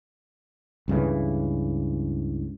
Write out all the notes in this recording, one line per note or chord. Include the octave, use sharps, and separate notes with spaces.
C#2 G2 C#3 E3